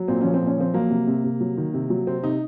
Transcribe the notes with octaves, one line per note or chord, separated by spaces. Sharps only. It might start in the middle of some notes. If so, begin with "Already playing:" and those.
Already playing: F#3
A#2 C4
F3 C#4
C4
A#2
C#4
F3 C4
F#3 A#3
C3
C3
C3
F#3
D#3
C3
F#3
C3 C4
C3 D#4